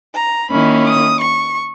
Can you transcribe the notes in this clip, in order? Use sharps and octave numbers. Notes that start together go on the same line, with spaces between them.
A#5
D#3 A#3 C#4 E4 B5
D#6
C#6